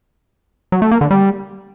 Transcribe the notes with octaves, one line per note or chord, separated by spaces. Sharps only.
F#3
A3
A#3
D3
G3